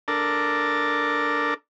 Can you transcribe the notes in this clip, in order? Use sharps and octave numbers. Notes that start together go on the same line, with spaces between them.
D4 A4 A#4